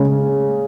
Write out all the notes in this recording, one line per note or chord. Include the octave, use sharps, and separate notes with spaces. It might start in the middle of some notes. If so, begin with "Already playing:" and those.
Already playing: C#3 G#3 C#4 G#4